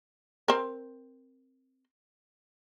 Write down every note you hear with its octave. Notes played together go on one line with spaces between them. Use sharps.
C4 A#4